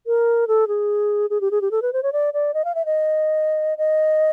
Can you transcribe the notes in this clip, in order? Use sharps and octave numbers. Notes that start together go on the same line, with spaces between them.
A#4
A4
G#4
G#4
G4
G#4
G4
A4
B4
C5
C#5
D5
D5
D#5
F5
E5
D#5
D#5